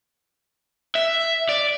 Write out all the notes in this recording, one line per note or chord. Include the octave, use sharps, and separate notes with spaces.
E5
D5